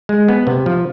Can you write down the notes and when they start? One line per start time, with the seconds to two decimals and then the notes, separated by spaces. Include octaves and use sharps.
0.09 G#3
0.29 B3
0.47 C3
0.66 F3